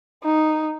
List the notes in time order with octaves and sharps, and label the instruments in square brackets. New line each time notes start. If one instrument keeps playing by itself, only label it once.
[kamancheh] D#4